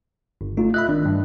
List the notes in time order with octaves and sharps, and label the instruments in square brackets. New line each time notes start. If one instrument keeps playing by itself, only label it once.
[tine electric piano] G1
[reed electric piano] A3 F4 [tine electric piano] D#4
[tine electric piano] D#5 E5 B5 [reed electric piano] F#6
[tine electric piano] D#3 [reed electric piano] D4
[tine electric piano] G2